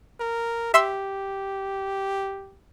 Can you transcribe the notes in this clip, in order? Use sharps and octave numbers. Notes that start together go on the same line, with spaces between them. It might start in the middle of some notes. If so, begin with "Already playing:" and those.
A#4
G4 E5 C6 E6